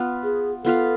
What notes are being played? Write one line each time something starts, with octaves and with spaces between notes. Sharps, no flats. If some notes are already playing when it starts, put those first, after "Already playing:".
Already playing: B3 F4 B4 F5
G#4
B3 F4 A4 B4 F5